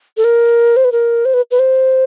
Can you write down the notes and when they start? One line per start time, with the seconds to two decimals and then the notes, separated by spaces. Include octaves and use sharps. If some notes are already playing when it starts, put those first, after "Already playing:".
0.17 A4
0.24 A#4
0.76 C5
0.84 B4
0.92 A#4
1.25 C5
1.34 B4
1.51 B4
1.59 C5